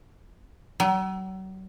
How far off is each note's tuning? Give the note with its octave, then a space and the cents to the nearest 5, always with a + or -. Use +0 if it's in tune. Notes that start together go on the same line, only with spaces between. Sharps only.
F#3 +40